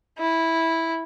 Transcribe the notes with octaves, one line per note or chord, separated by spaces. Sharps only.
E4